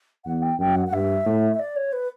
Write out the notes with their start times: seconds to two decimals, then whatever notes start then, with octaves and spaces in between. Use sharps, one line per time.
0.25 E2 F#5
0.42 G5
0.59 F#2 G5
0.75 F#5
0.87 F#5
0.92 G2 E5
1.26 A2
1.54 E5
1.59 D5
1.76 C#5
1.93 B4